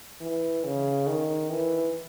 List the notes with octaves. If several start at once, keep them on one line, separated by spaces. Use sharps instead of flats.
E3
C#3
D#3
E3